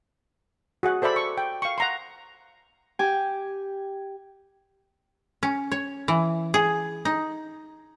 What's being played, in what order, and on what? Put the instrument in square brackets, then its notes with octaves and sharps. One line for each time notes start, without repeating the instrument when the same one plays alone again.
[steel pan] F#4 G#4 F#5
A4 C5 D5 E5 B5
C#6
G5
F5 C#6
F#5 A#5 C6
[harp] G4 G5 G#5
[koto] C#4
C#5
E3
G#4
D#4